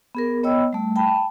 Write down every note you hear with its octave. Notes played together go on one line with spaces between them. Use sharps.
B3 G#4 A#4
B3 C#5 D#5 G5 B5 E6
G3 A3
G5 A5 B5